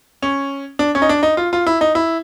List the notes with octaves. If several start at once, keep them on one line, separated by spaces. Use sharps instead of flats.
C#4
D4
C#4
D#4
D4
D#4
F4
F4
E4
D#4
E4